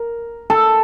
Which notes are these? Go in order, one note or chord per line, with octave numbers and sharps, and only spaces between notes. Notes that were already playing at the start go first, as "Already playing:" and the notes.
Already playing: A#4
A4